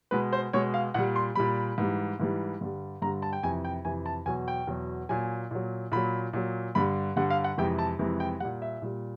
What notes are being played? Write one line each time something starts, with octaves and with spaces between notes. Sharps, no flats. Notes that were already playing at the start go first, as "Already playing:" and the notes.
B2 G#3 B4
C5
B2 G#3 C#5
F5
A#2 G3 F#5
C6
A#2 G3 B5
G#2 E3 G3
G#2 E3 G3
G2 D3 G3
G2 D3 G3 A#5
A5
G5
F2 C3 E3 G#5
G5
F2 C3 E3 G#5
A5
E2 B2 F#3 G#5
G5
E2 B2 F#3
A#2 F#3 G#5
A#2 F#3
A#2 F#3 B5
A#2 F#3
G2 D3 G3 B5
G2 D3 G3 F#5
F5
F#5
F2 C3 E3 G#3 G5
A5
F2 C3 E3 G#3
G5
A#2 G3 F#5
E5
A#2 G3